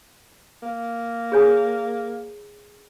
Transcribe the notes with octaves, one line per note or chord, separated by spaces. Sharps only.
A#3
G#4 C#5 G#5